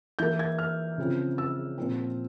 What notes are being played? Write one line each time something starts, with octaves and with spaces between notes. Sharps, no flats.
E3 A#3 G6
G#6
F6
C#3 F3 C4
E6
A#2 F3 C4